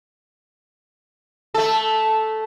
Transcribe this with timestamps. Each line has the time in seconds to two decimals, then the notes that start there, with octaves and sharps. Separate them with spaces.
1.54 A3 A4